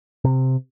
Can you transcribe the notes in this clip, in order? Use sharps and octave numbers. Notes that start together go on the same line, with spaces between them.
C3